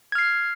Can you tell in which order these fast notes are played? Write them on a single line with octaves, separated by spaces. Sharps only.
G#6 F6 C7